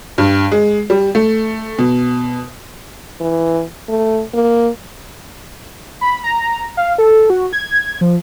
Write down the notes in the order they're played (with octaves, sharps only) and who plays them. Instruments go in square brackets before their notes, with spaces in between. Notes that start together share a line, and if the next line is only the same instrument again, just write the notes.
[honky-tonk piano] G2
G#3
G3
A3
B2
[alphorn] E3
A3
A#3
[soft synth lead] B5
A#5
F5
A4
F#4
G#6
F3